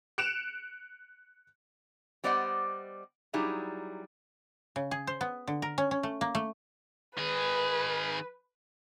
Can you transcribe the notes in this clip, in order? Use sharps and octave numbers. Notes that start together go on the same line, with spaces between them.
F#6 C#7 D7 E7 F7
G3 B3 C5 D5 D#5 F#5
F#3 G3 D#4 E4 G#4
C#3
G#4
C5
B3
D3
A#4
C#4
C#4
A3
A#3
A3
D#3 G#4 B4